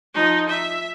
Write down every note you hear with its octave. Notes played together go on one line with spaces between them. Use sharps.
F3 D#4
E5